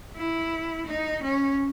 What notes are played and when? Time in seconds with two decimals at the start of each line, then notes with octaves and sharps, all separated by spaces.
0.16 E4
0.86 D#4
1.22 C#4